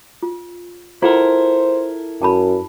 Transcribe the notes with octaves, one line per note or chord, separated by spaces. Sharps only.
F4
E4 F4 A4 A#4 C5 F#5
F#2 G5 A5 B5